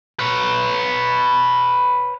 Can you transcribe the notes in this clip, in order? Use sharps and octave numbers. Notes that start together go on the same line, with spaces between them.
B4 C#5